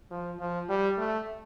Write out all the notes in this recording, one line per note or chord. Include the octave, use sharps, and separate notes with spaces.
F3
F3
G3
A3